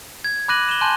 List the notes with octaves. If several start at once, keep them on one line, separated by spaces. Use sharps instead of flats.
G#6
B5 D6 F#6 A#6 D#7 F#7
E7 F#7 G7
G#5 A5 C6 F#6 G6 D#7